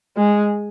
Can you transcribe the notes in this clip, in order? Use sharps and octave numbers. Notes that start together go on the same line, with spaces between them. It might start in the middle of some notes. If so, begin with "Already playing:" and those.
G#3